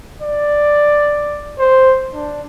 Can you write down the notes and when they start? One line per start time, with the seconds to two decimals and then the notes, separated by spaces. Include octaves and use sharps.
0.22 D5
1.59 C5
2.14 D4